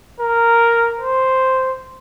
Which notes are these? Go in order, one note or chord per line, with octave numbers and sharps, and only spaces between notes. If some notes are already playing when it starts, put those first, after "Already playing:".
A#4
C5